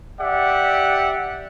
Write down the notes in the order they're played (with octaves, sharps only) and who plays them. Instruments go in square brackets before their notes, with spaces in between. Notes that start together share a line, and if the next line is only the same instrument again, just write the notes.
[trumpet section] G4 D5 E5 F#5